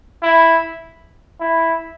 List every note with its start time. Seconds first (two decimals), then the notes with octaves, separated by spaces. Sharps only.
0.22 E4
1.40 E4